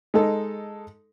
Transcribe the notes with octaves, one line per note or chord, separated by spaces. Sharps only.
G#3 D#4 A4